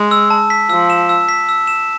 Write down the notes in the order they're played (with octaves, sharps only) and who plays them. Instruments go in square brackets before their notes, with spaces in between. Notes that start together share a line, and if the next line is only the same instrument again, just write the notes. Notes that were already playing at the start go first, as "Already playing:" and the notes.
Already playing: [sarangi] G#3
[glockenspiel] E6
A5
B6
[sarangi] F3 [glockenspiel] E6
[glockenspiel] E7
E6
B6
E6
E7